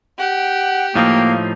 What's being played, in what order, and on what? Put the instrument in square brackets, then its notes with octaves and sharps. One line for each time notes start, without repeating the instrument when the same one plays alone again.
[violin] G4 [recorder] F#5
[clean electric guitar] A2 F3 D#4 [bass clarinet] A#3 [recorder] F5